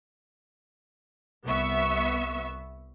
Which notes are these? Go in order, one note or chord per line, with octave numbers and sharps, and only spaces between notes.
C2 B3 E5 C#6